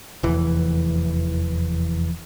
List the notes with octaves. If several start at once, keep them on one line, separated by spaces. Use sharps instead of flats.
F1 E2 E3